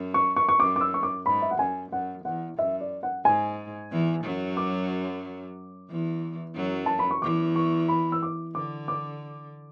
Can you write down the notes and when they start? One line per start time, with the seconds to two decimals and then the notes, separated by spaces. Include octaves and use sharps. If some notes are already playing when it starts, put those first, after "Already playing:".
Already playing: F#2
0.14 C#6
0.36 C#6
0.49 C#6
0.59 F#2 D6
0.76 D6
0.81 E6
0.94 C#6
1.03 D6
1.26 G#2 B5
1.42 E5
1.51 F#5
1.58 F#2 G#5
1.91 F#2 F#5
2.25 E2 F#5
2.58 F#2 E5
2.80 D5
3.03 F#5
3.25 G#2 G#5
3.91 E2 E3
4.24 F#2 F#3
4.57 D6
5.90 E2 E3
6.56 F#2 F#3
6.86 A5
6.99 B5
7.11 C#6
7.22 E2 E3 D6
7.56 C#6
7.88 B5
8.12 E6
8.23 D6
8.55 D3 D6
8.88 D6